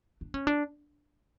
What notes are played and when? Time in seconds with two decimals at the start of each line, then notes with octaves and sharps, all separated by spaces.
0.21 D4
0.34 C#4
0.47 D4